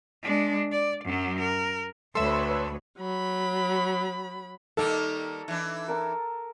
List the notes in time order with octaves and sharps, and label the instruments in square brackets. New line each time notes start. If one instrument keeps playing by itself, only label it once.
[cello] G#3 D4
D5
F#2 F#3
A#4
[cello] D2 [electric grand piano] A4 E5 [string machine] B4 C#5 B5 [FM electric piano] C6 E6
[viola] F#3 B5
[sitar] D#3 G3 A#3 [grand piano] A4
[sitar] E3 D4
[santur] A#4 A5 A#5